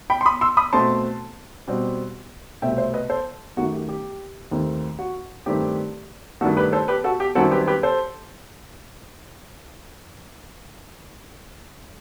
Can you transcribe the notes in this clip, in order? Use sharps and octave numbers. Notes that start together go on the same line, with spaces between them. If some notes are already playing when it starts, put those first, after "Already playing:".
G5 B5
C6
B5 D#6
C6 E6
B5 D#6
B2 A3 C4 A5 C6
B2 G3 C4
C2 B2 A3 C4 E5 G5
C5 E5
B4 D#5
A4 C5
F#2 D#3 A3 F#4
G4
G4
D#2 D#3 A3 C4
F#4
G2 D#3 A3 C4 G4
G2 D#3 A3 F#4 A4
G4 B4
A4 C5
G4 B4
F#4 A4
G4
F#2 D#3 G3 C4 F#4 A4
G4 B4
G4 B4
A4 C5